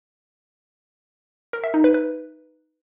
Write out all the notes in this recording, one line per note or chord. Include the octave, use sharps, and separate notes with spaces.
A#4
E5
D#4
B4
B4